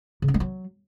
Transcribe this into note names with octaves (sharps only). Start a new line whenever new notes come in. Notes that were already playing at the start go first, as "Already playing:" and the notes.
C#3
C#4
G#3
F#3